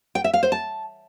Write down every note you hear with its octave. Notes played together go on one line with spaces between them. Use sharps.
G5
E5
F5
C5
A5